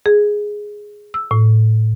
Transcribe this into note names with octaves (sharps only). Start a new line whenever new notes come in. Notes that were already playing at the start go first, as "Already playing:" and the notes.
G#4
E6
A2